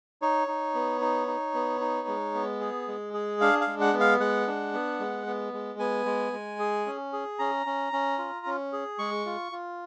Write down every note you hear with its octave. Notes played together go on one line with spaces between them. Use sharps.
D#4 C#5
D#4
B3
D#4
D#4
B3
D#4
G#3
B3
G#4
G#3
G#4
D4 F5
F5
G#3
F#5
B3
F5
G#3 F#5
D4
B3
G#3
B3
G#3
B3 G#5
G#3
G#3
G#4
C#4
G#4
C#4 A#5
C#4
C#4
F4
C#4
G#4
G#3 C#6
F4
F4